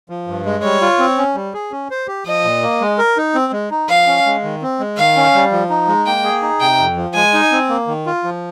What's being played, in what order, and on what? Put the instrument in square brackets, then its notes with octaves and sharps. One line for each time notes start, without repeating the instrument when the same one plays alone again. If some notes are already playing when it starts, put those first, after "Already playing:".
[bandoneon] F3
G2
G#3
[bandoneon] G3 [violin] C#5
[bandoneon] F4
C4
C#4
G3
G#4
C#4
C5
G4
[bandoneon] F3 [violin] D#5
[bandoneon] A#2
A#3
G#3
A#4
D#4
C4
G#3
D#4
[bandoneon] F3 [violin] F5
[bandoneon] C#4
G#3
D#3
C4
G#3
[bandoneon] D#3 [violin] F5
[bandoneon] C#4
G3
F3
D#4
G#3
[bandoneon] A#3 [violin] G5
[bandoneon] G#4
D#4
[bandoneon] C3 [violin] G5
[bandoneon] F2
F3
[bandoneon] G#3 [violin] G#5
[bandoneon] D#4
C4
A#3
D#3
F4
F3